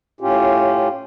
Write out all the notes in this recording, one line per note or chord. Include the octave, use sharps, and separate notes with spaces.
A2 C#4 F4 G4